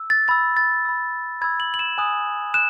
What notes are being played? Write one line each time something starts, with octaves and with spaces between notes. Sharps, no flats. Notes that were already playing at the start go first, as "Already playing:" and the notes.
Already playing: E6
A6
B5 E6 A6
A6
B5 E6
B5 E6 G#6
F#7
F#7
E7
G#5 D#6 F#6
F#6 E7